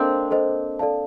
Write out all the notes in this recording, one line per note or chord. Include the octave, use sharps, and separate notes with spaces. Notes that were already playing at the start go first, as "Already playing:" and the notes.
Already playing: A#3 C4 D4 A4 C5 D#5
A4 C5 D#5
A4 D5 F5 A5